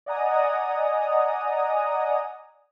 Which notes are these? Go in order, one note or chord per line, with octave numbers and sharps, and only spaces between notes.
D5 D#5 F#5 G#5 A#5 D#6